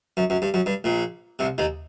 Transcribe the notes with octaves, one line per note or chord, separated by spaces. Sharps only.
F#2
F#2
G2
F#2
G2
A#1 A#2
C2 C3
D#2 D#3